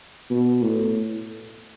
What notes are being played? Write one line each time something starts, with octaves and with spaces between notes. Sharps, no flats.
B2
A2